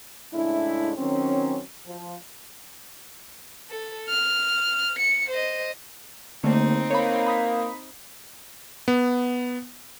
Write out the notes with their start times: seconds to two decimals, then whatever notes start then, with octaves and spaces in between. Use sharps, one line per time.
0.33 A2 C#3 G#3 D4 E4
0.97 D#3 F#3 C4 C#4
1.87 F3
3.70 A4
4.09 F6
4.99 C#7
5.29 C5 D#5
6.44 D#2 D3 A3 A#3 C4 D#4
6.90 A#3 C#5 B5
7.26 B5 D#6 B6
8.88 B3